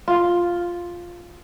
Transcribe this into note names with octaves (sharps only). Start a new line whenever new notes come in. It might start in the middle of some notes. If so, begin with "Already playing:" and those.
F4